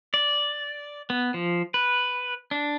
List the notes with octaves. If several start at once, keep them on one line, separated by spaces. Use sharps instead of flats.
D5
B3
F3
B4
D4